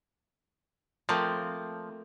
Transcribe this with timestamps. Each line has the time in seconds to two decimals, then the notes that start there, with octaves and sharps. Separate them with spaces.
1.09 F3 A3 A#3 C4